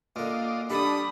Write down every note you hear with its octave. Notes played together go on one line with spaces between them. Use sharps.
A#2 D3 F4 D5 D#5
G3 D4 G4 A4 B5 D#6